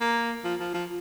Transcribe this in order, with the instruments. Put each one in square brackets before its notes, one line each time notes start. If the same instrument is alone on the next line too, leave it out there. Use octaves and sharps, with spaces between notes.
[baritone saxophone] A#3
F3
F3
F3